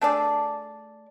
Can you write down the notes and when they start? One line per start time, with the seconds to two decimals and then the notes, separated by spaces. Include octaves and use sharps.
0.01 A3 D4 G#4 D5